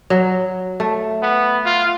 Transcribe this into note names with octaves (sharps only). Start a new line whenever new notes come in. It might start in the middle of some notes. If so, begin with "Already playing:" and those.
F#3
A3
B3
F4